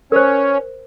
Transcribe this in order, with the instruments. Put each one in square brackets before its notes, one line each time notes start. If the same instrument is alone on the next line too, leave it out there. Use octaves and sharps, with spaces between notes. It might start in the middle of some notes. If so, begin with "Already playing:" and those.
[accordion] C#4 C#5 [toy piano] A#4 C5